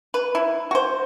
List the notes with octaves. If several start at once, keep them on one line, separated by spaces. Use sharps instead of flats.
B4
E4
F#4 C5